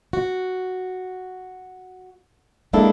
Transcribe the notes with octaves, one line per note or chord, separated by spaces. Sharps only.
F#4
G#3 A#3 D4 E4 A4